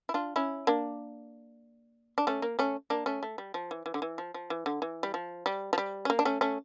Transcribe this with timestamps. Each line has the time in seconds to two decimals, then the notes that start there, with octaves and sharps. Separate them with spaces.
0.09 E4
0.14 D4 F4
0.36 C#4 E4
0.67 A#3 D4
2.18 D4
2.27 A3 C#4
2.42 A#3
2.59 A3 C#4
2.90 A#3 D4
3.06 A3 C#4
3.23 A3
3.38 G3
3.54 F3
3.71 E3
3.86 E3
3.94 D3
4.02 E3
4.18 F3
4.34 F3
4.50 E3
4.66 D3
4.82 E3
5.03 G3
5.14 F3
5.46 G3
5.73 F3
5.78 G3
6.05 C#4
6.10 A#3
6.19 D4
6.25 A3 C#4
6.41 A3 C#4